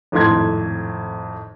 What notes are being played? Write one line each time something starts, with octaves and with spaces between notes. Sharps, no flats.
G#1 F2 A2 C6 G#6